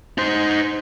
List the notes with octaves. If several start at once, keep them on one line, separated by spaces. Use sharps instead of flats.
D#4 C5